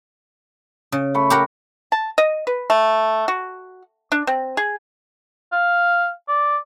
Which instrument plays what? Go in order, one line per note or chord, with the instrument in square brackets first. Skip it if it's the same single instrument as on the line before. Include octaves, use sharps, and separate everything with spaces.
[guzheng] C#3
[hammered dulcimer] A3 B5 C#6
[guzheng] G4 A#4 F#5
[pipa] A5
D#5
B4
A3
F#4
D4
C4
G#4
[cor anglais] F5
D5